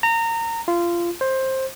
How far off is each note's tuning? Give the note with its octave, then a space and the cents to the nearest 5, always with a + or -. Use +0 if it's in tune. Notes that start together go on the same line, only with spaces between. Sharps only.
A#5 -25
F4 -20
C5 +15